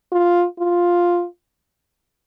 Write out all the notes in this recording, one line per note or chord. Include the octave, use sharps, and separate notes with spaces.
F4
F4